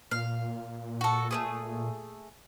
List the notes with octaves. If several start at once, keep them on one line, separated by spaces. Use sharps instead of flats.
A#2 F5
F#4 A4
A3 C#4 G#4